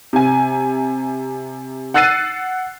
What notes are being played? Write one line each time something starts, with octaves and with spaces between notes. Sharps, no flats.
C3 G#5
F#5 E6 F#6 A6 C7 D#7